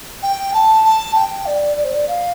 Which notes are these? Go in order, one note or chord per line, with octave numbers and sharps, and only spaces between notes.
G5
A5
A5
G5
D5
D5
C5
D5
F5